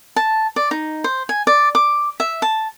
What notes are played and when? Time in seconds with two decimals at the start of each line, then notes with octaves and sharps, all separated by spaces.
0.16 A5
0.56 D5
0.71 D#4
1.04 C5
1.29 G#5
1.47 D5
1.75 D6
2.20 E5
2.42 A5